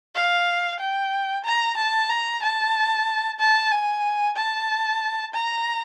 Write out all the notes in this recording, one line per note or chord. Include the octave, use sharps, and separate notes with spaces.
F5
G5
A#5
A5
A#5
A5
A5
G#5
A5
A#5